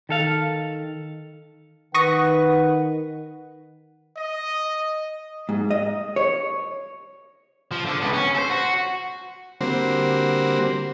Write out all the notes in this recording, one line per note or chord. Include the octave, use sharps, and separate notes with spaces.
D#3 A4 F5
D#3 B4 F#5 C#6 D#6 A#6
D#5
G#2
D#5
C#5
F3
D3 D4
C#2 B3
C#4
A4 C5
F#4
D3 G3 A#3 C4 F#4 C5